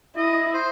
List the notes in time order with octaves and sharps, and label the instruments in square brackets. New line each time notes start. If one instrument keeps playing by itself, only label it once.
[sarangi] E4 [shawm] D#5
[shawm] C5